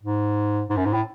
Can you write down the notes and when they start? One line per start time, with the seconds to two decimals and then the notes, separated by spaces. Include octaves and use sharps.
0.03 G#2
0.70 G#2
0.77 F#2
0.85 G#2
0.94 A2